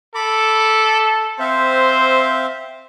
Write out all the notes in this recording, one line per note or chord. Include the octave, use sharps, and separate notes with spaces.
A4 B5 D6
C4 C5 E5 F5